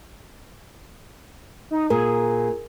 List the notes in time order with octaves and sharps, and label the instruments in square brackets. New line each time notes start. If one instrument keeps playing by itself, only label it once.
[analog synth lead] D#4
[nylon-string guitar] A#2 [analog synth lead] G#4 [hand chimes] A#4